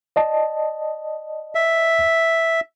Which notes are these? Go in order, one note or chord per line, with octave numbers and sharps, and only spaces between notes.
D5 D#5 A5
E5